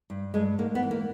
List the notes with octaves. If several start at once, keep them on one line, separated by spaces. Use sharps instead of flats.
G2
G2 G#3
G#2 A#3
B3
E3
A#3